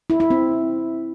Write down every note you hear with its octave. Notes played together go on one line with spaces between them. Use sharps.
E4
E4
C4